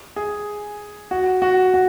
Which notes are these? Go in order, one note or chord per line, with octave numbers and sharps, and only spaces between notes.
G#4
F#4
F#4
F#4